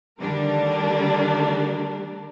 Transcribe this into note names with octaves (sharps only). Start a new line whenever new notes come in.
D3 D#3 G3 A3 D4 A#4